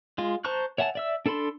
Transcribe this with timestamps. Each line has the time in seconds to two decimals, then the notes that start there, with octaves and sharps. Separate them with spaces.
0.18 G#3 F4
0.45 C5 A5 A#5 C#6 F#6
0.78 C#5 E5 F#5 G#5 A5
0.95 D5 E5 E6
1.26 D4 A4 A5 B5 C6